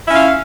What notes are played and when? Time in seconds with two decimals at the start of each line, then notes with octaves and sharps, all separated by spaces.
0.06 E4
0.10 C#4
0.14 F5